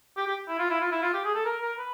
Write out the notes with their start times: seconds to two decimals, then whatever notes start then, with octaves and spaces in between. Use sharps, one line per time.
0.17 G4
0.27 G4
0.49 E4
0.59 F4
0.70 E4
0.81 F4
0.92 E4
1.02 F4
1.14 G4
1.25 G#4
1.35 A4
1.45 A#4
1.62 A#4
1.78 B4